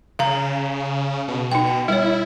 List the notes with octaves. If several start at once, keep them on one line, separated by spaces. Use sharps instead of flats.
C#3 F5 A#5
B2
B2 D#4 G5
G3 E4 C#5